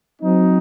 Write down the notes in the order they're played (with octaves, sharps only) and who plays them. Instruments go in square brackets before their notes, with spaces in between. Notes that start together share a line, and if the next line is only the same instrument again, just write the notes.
[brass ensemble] F#3 C4 D#4